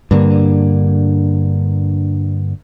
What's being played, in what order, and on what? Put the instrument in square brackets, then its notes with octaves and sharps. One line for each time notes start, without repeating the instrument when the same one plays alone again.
[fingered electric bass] G2 D3 A#3